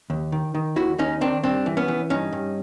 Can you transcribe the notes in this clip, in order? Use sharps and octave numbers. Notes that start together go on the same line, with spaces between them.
D#2
D#3
D#3
D#2 E4 F#4
D#2 C#4 D#4
D#3 C4 D4
G2 C4 D4
E3
B3 C#4
E3
G2 C#4 D#4
G2